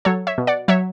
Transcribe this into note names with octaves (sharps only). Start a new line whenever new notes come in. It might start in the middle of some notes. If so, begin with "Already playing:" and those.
F#3 A4 C#5
C#5 E5
B2
D5 F#5
F#3 C#5 E5